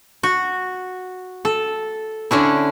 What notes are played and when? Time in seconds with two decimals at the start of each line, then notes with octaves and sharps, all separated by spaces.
0.23 F#4
1.45 A4
2.31 D3 C#4 D4 E4